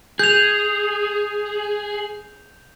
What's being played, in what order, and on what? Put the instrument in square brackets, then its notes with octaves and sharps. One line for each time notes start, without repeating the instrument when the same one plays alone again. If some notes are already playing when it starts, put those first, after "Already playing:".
[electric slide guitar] G#4 [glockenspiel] G6 F7